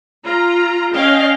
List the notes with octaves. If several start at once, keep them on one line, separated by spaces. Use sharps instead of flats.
F4 A#5
C#4 D#5 F5 G5